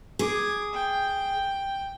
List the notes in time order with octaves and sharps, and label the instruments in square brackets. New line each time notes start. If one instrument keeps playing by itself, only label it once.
[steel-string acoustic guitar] G#4 [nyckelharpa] D6
[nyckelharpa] G5